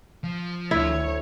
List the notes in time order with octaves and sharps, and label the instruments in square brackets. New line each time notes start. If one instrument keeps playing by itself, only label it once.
[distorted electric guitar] F3
[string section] D2 C#5 [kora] E4